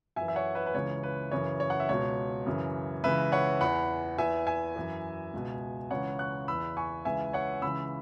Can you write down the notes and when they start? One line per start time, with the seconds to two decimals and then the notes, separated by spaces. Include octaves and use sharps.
0.16 F#2 E3 E5 G#5
0.28 E5
0.36 C#5 F#5
0.55 B4 E5
0.66 B4
0.74 C#2 C#3 E3 C#5
1.03 B4
1.31 F#2 C#3 E3 C#5
1.60 C#5
1.70 F#5
1.80 E5
1.89 C#2 B2 C#5
2.46 F#2 C#3 E3
3.04 C#2 C#3 E3 B4 E5
3.32 C#5 F#5
3.61 E2 E3 F#5 B5
4.18 E2 E3 E5 G#5
4.47 E5 G#5
4.76 F#2 E3
5.33 C#2 B2
5.91 C#2 C#3 E3 C#5 F#5
6.19 C#6 F#6
6.48 E2 E3 B5 E6
6.77 G#5 C#6
7.05 C#2 C#3 E3 E5 G#5
7.33 C#5 F#5
7.62 C#2 C#3 E3 B5 E6